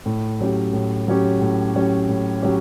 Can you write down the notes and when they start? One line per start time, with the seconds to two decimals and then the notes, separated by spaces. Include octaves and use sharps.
0.06 A2
0.41 F#3 C#4 G4
0.73 A2
1.08 F#3 C#4 G4
1.41 A2
1.75 F#3 C#4 G4
2.08 A2
2.42 F#3 C#4 G4